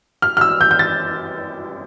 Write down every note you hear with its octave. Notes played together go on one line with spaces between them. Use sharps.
F6
F6
E6
G6
G6
A6